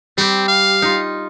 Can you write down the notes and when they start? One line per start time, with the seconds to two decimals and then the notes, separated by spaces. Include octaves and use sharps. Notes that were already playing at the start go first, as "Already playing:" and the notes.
0.18 G3 C4 G4
0.48 F5
0.82 D#4 F4